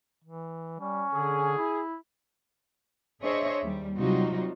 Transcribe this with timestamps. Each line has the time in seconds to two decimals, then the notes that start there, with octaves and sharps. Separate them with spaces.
0.24 E3
0.80 G3 C#4
1.14 D3 G#4
1.58 E4
3.21 D4 G#4 C5 C#5 D#5 E5
3.62 D#2 G3
3.97 C3 F#3 G3 D#4 F4 F#4